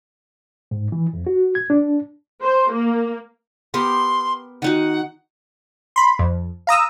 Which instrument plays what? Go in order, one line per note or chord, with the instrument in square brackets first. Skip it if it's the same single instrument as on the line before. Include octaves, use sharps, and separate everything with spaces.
[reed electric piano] G#2
E3
F2
F#4
G#6
D4
[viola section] C5
A#3
[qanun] B3 G4 A#4 [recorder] C6
[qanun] D#3 D#4 F#4 [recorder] F#5
[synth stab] B5 C6
F2
F5 A#5 D#6 E6